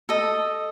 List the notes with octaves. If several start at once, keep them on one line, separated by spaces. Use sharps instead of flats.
A4 D#5